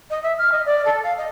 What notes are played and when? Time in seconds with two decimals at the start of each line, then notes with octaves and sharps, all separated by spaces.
0.10 D#5
0.22 E5
0.38 F6
0.51 D#5
0.65 D5
0.85 A4
1.03 F5
1.17 D#5